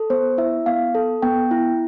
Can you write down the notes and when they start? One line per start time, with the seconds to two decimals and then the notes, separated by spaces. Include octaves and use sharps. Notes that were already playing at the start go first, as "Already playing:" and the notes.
Already playing: A4
0.10 B3 C5
0.38 E4 E5
0.66 B3 F5
0.95 A4
1.22 B3 G5
1.51 E4